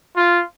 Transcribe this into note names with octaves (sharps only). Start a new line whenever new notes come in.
F4